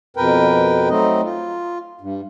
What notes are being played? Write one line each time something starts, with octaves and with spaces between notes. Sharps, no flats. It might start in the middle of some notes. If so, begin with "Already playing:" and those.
F2 B2 A#4 B4 G5
F#3 A3 C4 D#4 D#5
F4
G2